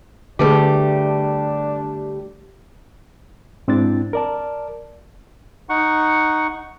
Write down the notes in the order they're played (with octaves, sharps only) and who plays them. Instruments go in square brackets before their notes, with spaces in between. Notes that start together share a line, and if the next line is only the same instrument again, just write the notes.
[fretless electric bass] D3 [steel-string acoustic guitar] G3 A3 G4 [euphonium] D4 [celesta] G#4 B4 D6
[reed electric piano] G#2 C4 D4 E4 A6
A#4 D5 A5
[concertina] D#4 F#5 C#6